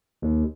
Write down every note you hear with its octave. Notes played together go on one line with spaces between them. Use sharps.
D#2